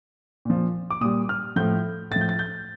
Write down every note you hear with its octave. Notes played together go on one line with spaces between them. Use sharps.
A#2 F3
D6
A#2 G3 D#6
F6
A2 F3 G6
A2 A6
F3
G6
A6
G6